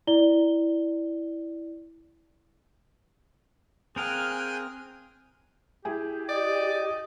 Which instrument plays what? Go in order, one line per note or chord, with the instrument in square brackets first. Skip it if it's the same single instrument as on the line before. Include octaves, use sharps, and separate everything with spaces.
[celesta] E4 D5 G7
[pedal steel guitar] C4 A#4 F5 [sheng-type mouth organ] G#4 G5 D#6 [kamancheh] G#5 F#6
[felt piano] E4 G#4 G5 [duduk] G4
[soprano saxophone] D5 [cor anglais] D#5